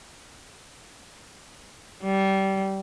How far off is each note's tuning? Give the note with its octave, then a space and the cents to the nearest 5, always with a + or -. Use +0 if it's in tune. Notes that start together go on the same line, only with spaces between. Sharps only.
G3 -20